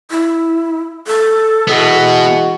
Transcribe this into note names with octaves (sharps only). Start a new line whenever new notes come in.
E4
A4
B2 E3 G#3 B3 F#4